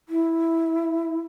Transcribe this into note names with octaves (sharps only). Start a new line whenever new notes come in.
E4